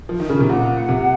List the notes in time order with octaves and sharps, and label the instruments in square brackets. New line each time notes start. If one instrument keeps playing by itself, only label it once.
[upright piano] F3
D#3
C#3
C3
[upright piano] A#2 [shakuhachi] F#5
[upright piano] C3